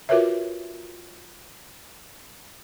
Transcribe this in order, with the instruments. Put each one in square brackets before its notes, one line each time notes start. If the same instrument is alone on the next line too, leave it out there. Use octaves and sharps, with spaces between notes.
[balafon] F4 F#4 A#4 B4 C#5 E5